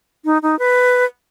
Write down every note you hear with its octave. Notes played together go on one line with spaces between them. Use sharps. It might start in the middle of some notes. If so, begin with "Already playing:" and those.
D#4
D#4
B4